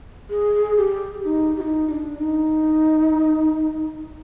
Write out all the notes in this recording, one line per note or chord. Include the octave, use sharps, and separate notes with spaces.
G#4
G4
D#4
G4
D#4
D#4
D4
D#4